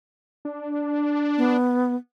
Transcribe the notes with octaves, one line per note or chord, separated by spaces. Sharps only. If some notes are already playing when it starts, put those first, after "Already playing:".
D4
B3